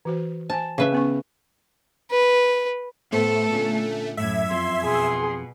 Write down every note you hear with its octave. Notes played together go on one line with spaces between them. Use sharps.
E3 F#4 C5
C5 G#5 A5
C#3 B4 E5
B3 C#4 C#6
B4
A2 A3 B3 A4 C5
A#2 D3 C#4
F#2 A2 E5 G#6
F2 C6
B2 G#4 C6